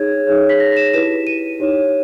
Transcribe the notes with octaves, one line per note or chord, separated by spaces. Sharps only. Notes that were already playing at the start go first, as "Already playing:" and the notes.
Already playing: D#4 G#4 C#5 G#6
D#4 G#4 C#5
B6
A#6
E7
E4 G4 B4 E7
D#7
D#4 G4 C#5